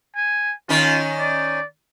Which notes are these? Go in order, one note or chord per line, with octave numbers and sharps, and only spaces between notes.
G#5
D#3 C#4 F4
D5